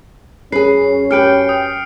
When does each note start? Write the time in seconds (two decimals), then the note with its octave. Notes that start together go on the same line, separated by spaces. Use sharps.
0.52 F#2 C#4 G#4 B4 C7
1.11 G4 B4 G5 F6 C#7 D7
1.49 D#6